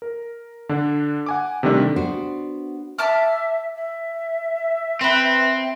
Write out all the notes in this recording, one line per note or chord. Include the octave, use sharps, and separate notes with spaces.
A#4
D3 D4
F#5 G#5 D6
C3 D#3 G3 A3 D4
B3 D4 F#4 C5
E5 A5 D6 F6
E5
C4 B4 C5